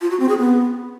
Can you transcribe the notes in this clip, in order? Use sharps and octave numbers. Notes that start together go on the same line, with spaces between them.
F4
F#4
C4
G#4
B3